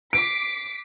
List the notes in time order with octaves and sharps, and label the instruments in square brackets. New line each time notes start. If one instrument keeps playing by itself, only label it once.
[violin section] D6 B6 C7 [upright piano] D7